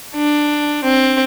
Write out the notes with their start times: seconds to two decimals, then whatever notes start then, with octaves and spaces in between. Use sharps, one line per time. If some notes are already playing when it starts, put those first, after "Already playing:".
0.15 D4
0.84 C4